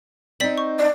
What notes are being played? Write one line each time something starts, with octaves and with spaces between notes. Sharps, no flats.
C4 D#4 D5 B6 F#7
C#6
D5